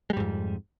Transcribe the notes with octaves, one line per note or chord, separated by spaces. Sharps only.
F2 G#2 G3 G#3